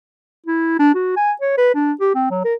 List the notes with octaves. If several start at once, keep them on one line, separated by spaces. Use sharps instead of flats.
E4
D4
F#4
G#5
C#5
B4
D4
G4
C4
F#3
A#4